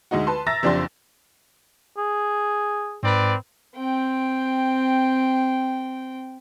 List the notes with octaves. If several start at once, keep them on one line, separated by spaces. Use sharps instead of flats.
D2 G#3 D#4 F#4
B4 A5 C6
E5 A#5 E6 A6 A#6
F#1 F2 D4 G4 C6 A6
G#4
G#2 C4 B4 D5
C4 G5